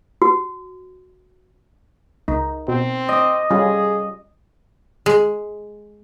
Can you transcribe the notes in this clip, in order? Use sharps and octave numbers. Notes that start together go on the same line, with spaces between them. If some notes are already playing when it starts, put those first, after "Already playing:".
F#4
C#2 D#4
B2 C4
D#5 D6
G3 C#4 F4 G#4
G#3